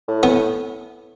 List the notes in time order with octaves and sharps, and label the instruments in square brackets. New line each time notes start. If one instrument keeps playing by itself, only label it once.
[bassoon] A2
[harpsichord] B3